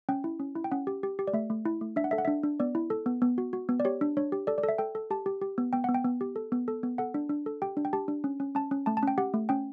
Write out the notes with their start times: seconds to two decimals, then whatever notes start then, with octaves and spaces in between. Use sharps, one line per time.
0.09 C#4 G5
0.24 E4
0.40 C#4
0.55 E4
0.64 G5
0.71 C#4 F#5
0.87 G4
1.03 G4
1.19 G4
1.27 D5
1.33 A3 E5
1.50 A3
1.65 E4
1.81 A3
1.96 D4 E5
2.04 F#5
2.11 A4 E5
2.18 F#5
2.25 D4 E5
2.43 D4
2.60 B3 D5
2.75 E4
2.90 A4
3.06 B3
3.22 B3
3.38 F#4
3.53 F#4
3.69 B3
3.80 D5
3.85 G4 C#5
4.01 D4
4.17 D4 C#5
4.32 G4
4.47 A4 D5
4.58 D5
4.63 A4
4.69 E5
4.78 A4 G5
4.95 A4
5.11 G4 A5
5.26 G4
5.42 G4
5.58 B3
5.73 B3 G5
5.84 B3 F#5
5.95 G5
6.05 B3
6.21 G4
6.36 A4
6.52 B3
6.68 A4
6.83 B3
6.98 A4 F#5
7.14 D4
7.29 D4
7.46 A4
7.62 G4 G5
7.77 D4
7.85 G5
7.93 G4 A5
8.08 D4
8.24 C#4
8.40 C#4
8.55 C#4 A5
8.71 C#4
8.86 A3 A5
8.97 A5
9.03 C#4 G5
9.18 G4 F#5
9.34 A3
9.49 C#4 G5